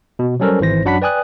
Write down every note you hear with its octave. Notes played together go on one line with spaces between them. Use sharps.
B2
F#3 G3 C#4 A4 A#4 C5
G#1 E3 C5 A#6
F#2 F#3 D4 F#5 B5 B6
B4 D5 G5 G#5 D#6 F#6